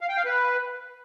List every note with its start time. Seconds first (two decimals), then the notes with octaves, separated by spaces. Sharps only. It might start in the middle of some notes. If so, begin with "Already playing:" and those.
0.01 F5
0.09 G5
0.17 F5
0.25 B4